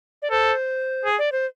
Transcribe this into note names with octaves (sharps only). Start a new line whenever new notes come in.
D5
A4 C5
G#4
D5
C5